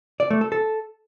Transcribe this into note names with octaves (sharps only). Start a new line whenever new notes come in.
D5
A3
A4
A4